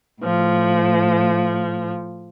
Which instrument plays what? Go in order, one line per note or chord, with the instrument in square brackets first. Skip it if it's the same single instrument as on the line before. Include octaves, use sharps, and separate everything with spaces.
[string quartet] A2 F3